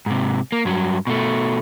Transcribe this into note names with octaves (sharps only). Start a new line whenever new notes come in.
G#2 C3
A#3
G2 F#3
B2 A3